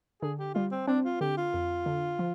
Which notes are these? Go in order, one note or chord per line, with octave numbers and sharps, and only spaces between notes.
D3 G#4
G4
G3 F4
C4
C4 D4
F4
D3 G4
F4
F2
D3
F3